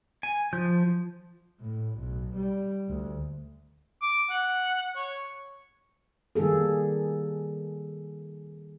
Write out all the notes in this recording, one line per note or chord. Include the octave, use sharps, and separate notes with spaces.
G#5
F3 G6
A2
B1
G3
D2
D6
F#5
C#5
D#3 G3 A#3 G#4 A4